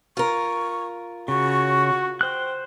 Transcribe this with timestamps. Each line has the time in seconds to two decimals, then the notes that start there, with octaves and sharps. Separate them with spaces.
0.17 F4 A#4 C#6
1.28 C#3 F#4 C#6
2.21 C5 G5 F#6